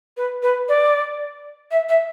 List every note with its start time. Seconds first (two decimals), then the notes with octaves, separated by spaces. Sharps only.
0.17 B4
0.43 B4
0.68 D5
1.71 E5
1.89 E5